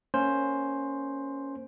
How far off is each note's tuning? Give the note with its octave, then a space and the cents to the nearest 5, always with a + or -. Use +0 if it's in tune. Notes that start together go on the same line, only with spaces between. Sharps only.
A#3 +0 C#4 +0 C5 +5